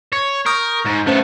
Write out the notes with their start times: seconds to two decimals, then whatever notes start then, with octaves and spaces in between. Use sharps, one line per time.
0.13 C#5
0.46 A#4 C#6 D#6 G6
0.86 G#2
1.07 A3 B3 C#4 C5 E5